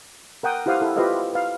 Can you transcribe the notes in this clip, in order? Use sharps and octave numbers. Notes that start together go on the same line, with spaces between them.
A#4 F#5 G5 D#6
E4 G4 C5 F5 F#5 D#6
E4 G4 A4
F4 G4 B4 C5 D#5 F5
B4 F5